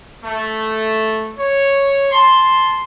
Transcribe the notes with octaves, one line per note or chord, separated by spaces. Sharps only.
A3
C#5
A5 C6